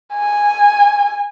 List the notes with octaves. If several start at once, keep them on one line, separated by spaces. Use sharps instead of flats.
G#5